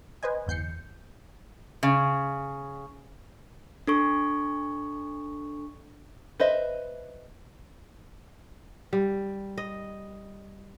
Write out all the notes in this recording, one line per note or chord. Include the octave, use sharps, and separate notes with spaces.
B4 C5 D#5 G#5
G1 E2 G6 C7 C#7
C#3
D4 A4 C#6
B4 C5 D#5 E5
G3
D#5